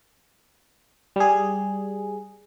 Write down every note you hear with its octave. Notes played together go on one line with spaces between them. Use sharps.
G3 G#4